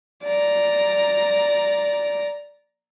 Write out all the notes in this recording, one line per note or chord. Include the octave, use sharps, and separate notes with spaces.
D5 A#5